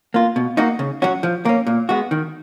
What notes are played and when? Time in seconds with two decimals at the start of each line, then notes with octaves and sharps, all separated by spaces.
0.14 A#3 F4
0.36 B2
0.57 A#3 D#4 F#4
0.79 C#3
1.02 F#3 C#4 F#4
1.23 F3
1.45 A#3 C#4
1.67 A#2
1.89 G#3 B3 F#4
2.11 D#3